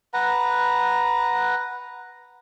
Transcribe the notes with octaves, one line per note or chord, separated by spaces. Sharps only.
B4 F#5 A#5